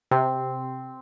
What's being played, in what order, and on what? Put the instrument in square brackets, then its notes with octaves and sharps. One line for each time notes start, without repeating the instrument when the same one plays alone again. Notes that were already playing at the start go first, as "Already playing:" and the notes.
[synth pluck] C3 [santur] C4